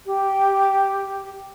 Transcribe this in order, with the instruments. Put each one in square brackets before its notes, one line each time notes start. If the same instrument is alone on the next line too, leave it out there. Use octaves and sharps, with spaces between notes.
[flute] G4